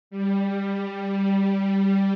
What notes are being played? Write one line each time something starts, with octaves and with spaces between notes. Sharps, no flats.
G3